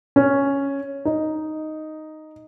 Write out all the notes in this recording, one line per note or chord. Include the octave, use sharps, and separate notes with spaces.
C#4
D#4